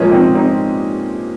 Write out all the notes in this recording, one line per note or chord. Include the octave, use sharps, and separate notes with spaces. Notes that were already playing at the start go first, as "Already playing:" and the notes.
Already playing: A#2 F3 G#3 A#3 C#4
C4 D#4
C4 D#4